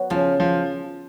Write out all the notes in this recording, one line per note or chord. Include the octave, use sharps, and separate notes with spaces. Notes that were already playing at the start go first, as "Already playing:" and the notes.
Already playing: F#3 B3 F#4
C#3 F3
F3